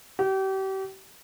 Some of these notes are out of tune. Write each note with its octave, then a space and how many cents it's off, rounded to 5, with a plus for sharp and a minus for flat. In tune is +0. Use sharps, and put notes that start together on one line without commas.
G4 -35